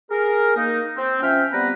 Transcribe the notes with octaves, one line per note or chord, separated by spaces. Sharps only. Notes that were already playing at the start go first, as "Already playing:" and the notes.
G#4 A#4
A#3 D#4
C4
F3 C#4 E5 G5 F6
G3 B3 C4 B4 A#5